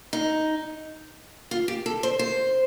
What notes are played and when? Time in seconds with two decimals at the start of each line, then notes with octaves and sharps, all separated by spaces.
0.13 D#4
1.51 F4
1.68 G4
1.86 A4
2.03 C5
2.19 C5